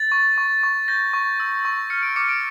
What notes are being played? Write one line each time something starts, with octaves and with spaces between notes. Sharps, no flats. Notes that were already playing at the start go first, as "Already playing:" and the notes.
Already playing: A6
C#6
C#6
C#6
G6 A#6
C#6
E6
C#6
F6 C#7
D7
D6 C#7
D7